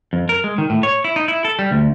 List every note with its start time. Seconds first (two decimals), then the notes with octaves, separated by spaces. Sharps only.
0.13 F2
0.29 A#4
0.44 G#3
0.58 D#3
0.70 A2
0.83 C#5
1.04 E4
1.16 D#4
1.28 E4
1.45 A4
1.59 G3
1.71 D2